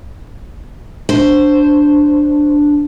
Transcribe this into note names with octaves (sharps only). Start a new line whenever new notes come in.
D4 C5